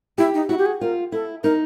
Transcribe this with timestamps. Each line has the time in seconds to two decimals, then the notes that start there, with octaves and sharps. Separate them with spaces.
0.18 E4 G4
0.34 D#4
0.49 E4 F#4
0.58 G4
0.66 G#4
0.81 F4 A#4
1.12 E4 A4
1.43 D#4 A#4